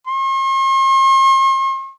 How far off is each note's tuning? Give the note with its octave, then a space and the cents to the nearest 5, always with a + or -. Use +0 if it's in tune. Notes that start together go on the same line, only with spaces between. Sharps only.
C6 +45